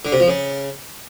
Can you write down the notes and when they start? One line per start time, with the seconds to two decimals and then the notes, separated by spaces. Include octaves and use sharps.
0.05 D3
0.12 C3
0.20 F3
0.28 C#3